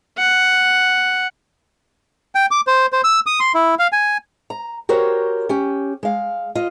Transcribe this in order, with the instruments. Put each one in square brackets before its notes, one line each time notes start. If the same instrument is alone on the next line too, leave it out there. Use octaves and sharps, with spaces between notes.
[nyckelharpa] F#5
[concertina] G5
D6
C5
C5
E6
D#6
C6
E4
F5
G#5
[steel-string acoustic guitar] A#5
F#4 G4 A#4 C5 C#5
C#4 G4
G#3 F5
F4 D#5